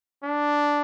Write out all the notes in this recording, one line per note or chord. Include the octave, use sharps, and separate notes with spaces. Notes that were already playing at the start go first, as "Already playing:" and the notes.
D4